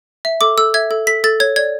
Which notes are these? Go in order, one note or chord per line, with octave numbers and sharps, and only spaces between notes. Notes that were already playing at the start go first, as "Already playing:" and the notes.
E5
A4 D6
A4 E6
E5 G#6
A4
A4 B6
A4 A6
C#5 G#6
D5 G#6